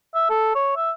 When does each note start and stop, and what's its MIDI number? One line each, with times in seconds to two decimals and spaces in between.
0.14 0.25 76
0.30 0.50 69
0.55 0.71 73
0.76 0.91 76